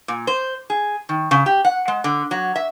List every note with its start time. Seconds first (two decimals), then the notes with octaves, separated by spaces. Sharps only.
0.08 A#2
0.27 C5
0.70 G#4
1.09 D#3
1.31 C#3
1.46 G4
1.65 F#5
1.88 G#3
2.04 D3
2.31 F#3
2.56 E5